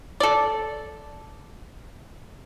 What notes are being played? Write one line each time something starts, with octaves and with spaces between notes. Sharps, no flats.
A4 D5